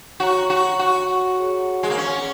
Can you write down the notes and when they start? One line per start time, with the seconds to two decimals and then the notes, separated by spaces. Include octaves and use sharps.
0.20 F#4 C#5 F#5 A#5 C#6
0.50 F#4
0.79 F#4
1.38 G#4 C#5 F#5
1.83 G#3
1.90 A#3
1.97 C#4